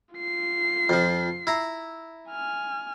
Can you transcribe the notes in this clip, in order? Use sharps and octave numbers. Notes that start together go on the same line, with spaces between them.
F4 C7
F2 F3
E4 A#5
G#5 F6